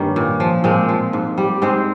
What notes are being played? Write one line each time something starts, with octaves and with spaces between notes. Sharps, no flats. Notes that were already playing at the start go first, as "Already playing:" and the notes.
Already playing: G2 D#3 G3 A#3 C#4
A#2
F3
A#2 G#3 C4
F3
G#2
G3
G#2 G#3 C4